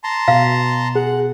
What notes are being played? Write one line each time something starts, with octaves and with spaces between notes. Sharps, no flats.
A5 A#5 C6
B2 F5
G#4 F#5